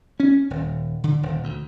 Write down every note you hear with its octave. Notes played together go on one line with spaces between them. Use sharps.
C#4
D#1
D3
D#1
D2